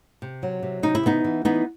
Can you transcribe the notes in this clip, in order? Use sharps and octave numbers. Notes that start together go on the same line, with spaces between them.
C3
F#3
C3
C3 D#4
E4
E3 B3 D#4
E3
E3 B3 D#4